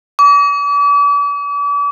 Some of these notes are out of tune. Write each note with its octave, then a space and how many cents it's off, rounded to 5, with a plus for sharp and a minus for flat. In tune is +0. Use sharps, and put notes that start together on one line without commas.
D6 -40